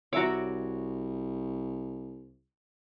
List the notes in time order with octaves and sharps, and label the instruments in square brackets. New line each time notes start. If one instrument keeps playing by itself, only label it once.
[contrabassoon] C2 [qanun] F#4 D6 [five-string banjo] C#5 E5 A#5